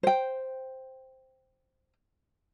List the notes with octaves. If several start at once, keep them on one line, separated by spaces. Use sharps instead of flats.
C5 G5